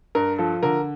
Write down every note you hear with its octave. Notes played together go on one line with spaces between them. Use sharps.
G2 A#4
F3 A4
D3 A#4